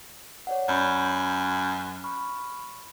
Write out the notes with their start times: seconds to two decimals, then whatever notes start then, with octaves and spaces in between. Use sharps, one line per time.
0.47 C#5 D5 F#5
0.69 F#2 C#4 B5 G6
2.04 B5 C#6 F6